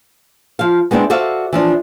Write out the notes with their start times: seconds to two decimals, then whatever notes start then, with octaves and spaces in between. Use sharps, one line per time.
0.59 F3 F5
0.91 G#3 B3 C4 D4 E4
1.10 F#4 A4 C5 D5 E5 F5
1.53 E3 F3 D4